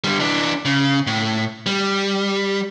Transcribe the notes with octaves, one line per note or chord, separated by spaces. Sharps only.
D3 G3
E3 D4
C#3
A2
G3